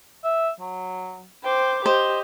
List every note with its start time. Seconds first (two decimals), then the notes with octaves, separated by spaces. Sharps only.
0.24 E5
0.60 F#3
1.44 C5 G5 D6
1.86 G4 C5 D#5